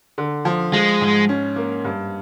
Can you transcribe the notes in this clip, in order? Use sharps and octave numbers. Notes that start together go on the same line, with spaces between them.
D3
F3
F3 G#3
G#2
C#4
A#3
G2